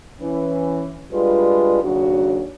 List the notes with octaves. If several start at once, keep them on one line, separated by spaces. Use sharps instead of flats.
E3 C#4
G3 G#3 D4 F4 B4
D#2 C#3 F#3 D4 F#4